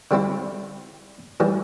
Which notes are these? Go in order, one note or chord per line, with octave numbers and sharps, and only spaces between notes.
D3 G3 C4 E4
A2 E3 G3